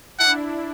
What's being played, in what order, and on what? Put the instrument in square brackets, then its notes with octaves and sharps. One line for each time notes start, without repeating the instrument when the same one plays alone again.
[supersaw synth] D4 E4 [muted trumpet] F#5